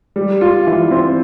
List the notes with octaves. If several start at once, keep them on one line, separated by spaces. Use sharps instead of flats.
G3
F4
E3
C4